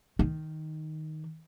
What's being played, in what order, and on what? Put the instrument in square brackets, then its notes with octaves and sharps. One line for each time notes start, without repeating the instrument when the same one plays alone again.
[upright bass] D#3